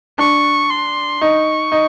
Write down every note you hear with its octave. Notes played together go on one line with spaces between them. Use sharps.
D4 C#6
C6
D#4 C#6
D#4